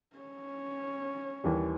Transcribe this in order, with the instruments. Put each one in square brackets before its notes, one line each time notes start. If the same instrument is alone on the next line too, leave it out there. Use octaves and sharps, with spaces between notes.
[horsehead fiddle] C#4 C#5
[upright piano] D#2 E3 G3